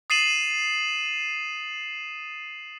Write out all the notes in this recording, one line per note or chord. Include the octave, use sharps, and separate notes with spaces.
D#6 A6 C7 D#7 E7 F#7